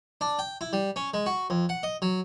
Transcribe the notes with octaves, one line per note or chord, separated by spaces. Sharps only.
D4
G5
E4
G3
C#4
G#3
F#4
F2
F#5
D#5
F#3